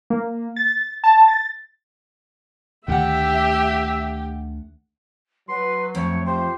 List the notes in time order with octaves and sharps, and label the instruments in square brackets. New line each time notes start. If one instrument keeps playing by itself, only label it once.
[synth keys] A#3
A6
A5
A6
[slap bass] D2 D3 A3 [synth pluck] D#3 F#5 [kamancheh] G4 [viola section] E5
[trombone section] F#3 [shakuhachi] B4 [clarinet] C6
[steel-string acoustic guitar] F2 [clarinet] A3 [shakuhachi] C#5
[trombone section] F4 G4 [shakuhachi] C5